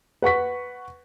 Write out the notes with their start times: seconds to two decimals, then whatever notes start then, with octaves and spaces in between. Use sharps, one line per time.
0.22 B4 F#5 C#6 B6